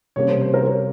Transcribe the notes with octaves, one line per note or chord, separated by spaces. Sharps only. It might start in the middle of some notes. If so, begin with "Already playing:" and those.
C3 G3 A#3 C#4 C#5
C5
C5
A#4
C5
C#5